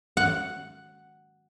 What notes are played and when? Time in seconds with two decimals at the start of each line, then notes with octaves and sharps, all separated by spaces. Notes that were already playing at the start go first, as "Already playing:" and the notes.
0.17 F#5